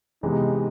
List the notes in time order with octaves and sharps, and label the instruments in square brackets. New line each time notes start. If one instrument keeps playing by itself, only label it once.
[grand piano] C3 E3 G#3 B3 [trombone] D#4